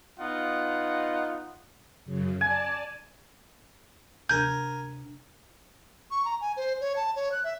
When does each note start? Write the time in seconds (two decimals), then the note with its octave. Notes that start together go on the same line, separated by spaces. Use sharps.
0.20 B3 D#4 F4 D#5 F#5
2.05 F#2 C#3
2.41 D5 G#5 A5
4.29 C3 D4 A#4 G#5 G6
6.11 C#6
6.25 A#5
6.41 G#5
6.57 C5
6.81 C#5
6.96 A5
7.16 C#5
7.32 F#6
7.44 E5